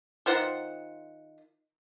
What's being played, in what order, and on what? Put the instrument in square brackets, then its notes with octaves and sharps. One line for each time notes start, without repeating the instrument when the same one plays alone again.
[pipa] D#3 F4 C5 F#5